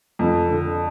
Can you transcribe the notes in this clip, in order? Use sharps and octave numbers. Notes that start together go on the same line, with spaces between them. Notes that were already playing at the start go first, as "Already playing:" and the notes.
F2
D3